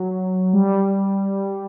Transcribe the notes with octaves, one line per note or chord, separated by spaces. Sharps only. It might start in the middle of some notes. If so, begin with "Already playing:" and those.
Already playing: F#3
G3